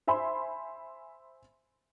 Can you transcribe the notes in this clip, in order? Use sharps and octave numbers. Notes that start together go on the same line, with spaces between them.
C5 E5 G#5 B5 C6